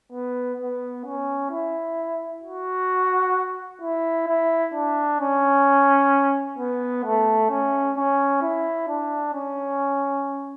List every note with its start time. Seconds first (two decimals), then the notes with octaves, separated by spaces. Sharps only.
0.12 B3
0.60 B3
1.05 C#4
1.51 E4
2.44 F#4
3.82 E4
4.28 E4
4.74 D4
5.20 C#4
6.58 B3
7.04 A3
7.50 C#4
7.97 C#4
8.42 E4
8.88 D4
9.34 C#4